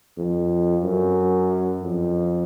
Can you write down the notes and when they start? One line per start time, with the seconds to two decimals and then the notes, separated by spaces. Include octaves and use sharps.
0.17 F2
0.83 F#2
1.83 F2